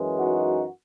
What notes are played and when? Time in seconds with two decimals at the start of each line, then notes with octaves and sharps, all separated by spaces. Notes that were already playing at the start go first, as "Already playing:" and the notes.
Already playing: F#2 E3 G#3
0.18 D#4 F#4